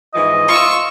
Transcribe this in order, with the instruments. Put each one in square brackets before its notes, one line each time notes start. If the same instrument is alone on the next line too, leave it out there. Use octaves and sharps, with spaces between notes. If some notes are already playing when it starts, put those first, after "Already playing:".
[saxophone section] G#2 E3 F3 [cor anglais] D#5
[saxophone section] F4 [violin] C#6 E6